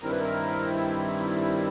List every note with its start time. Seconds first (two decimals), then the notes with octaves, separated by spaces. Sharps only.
0.01 G2 D#3 G3 C4 E4 A#4
0.11 B4
0.21 A#4